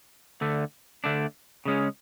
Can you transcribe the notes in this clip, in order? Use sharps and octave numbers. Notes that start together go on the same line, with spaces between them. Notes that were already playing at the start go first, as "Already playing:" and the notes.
D2 D3 A3
D2 D3 A3 D4
C#3 G#3 C#4